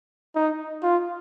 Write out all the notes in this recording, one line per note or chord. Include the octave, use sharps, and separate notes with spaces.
D#4
F4